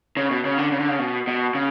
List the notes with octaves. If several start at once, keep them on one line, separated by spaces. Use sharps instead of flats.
C#3
B2
C#3
D3
C#3
D3
C#3
B2
B2
C#3